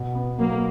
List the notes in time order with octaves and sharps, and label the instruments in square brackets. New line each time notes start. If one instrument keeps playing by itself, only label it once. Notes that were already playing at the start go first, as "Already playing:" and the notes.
Already playing: [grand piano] B2
B3
[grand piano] F#3 [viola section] A#3